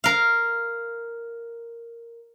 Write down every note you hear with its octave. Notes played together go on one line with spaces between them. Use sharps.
A#4 F5